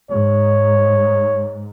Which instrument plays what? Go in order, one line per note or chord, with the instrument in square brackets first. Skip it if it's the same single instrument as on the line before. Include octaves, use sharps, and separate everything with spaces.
[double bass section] G#2 [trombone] C#5